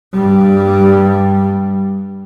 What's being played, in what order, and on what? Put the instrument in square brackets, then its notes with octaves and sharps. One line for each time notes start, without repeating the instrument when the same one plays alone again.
[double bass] G2 G3